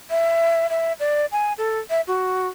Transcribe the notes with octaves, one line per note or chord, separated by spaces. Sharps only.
E5
E5
D5
G#5
A4
E5
F#4